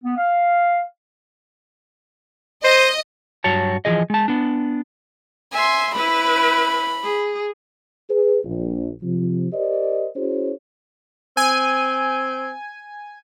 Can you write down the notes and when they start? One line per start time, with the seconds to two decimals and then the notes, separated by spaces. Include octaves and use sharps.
0.04 B3
0.17 F5
2.64 C5 D#5
3.44 G2 F#3 F#4 C#5 A5
3.85 E3 F3 G#4 D#5
4.10 G#3 A5
4.28 B3 D4
5.53 E5 G#5 C6
5.95 E4 B4 B5
7.03 G#4
8.10 G#4 B4
8.44 A#1
9.03 C3 F3
9.53 G4 A#4 C5 D5 D#5
10.16 C#4 E4 F#4 G#4 C5 C#5
11.37 C4 G#5